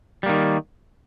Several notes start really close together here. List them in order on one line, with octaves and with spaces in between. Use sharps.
G3 A#3 D#3